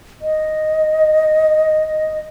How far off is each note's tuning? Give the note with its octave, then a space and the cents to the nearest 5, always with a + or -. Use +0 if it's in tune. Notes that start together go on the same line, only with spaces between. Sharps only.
D#5 +0